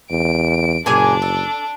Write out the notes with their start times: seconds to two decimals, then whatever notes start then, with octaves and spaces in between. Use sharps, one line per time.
0.10 E2 D7
0.86 F#1 A#2 D4 G#4 G#5
1.22 A4